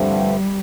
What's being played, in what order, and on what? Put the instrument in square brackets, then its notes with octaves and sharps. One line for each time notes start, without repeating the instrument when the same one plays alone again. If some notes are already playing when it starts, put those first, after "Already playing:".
Already playing: [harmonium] G2 D3 F3 A3 C4 [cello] G3